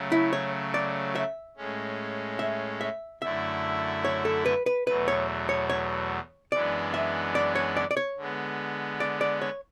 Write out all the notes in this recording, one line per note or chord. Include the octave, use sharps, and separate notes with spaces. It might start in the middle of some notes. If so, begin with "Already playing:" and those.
Already playing: C#3 F#3 A3
E4
C#5
D5
E5
A2 G#3 C#4
E5
E5
F#2 D3 A3 E4 E5
C#5
A4
B4
B4
E2 B2 F#3 A3 B4
C#5
C#5
C#5
F#2 E3 G#3 B3 D4 D5
E5
D5
C#5
D5
D5
C#5
D3 G#3 B3
D5
D5
C#5